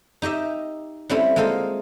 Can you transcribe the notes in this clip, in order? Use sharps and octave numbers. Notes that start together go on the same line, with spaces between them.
D#4 G4 D#5 E5
G3 A3 C4 C#4 E4 A4
G#3 A#3 F4 A4 C5 D#5